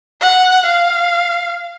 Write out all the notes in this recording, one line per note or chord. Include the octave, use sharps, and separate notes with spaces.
F#5
F5